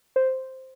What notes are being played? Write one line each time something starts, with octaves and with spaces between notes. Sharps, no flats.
C5